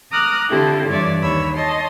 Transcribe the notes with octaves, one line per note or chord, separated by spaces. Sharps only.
A#5 D6 D#6 F6 F#6
D3 C4 E4 F4 G4 A4
G2 E3 C#5 D5 E5
D#2 C#5 B5 E6
C#5 D#5 A5 C6